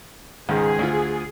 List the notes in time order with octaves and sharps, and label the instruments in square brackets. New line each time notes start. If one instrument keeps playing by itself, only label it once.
[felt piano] C#2 G#2 D#3 [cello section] G#4
[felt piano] D2 F4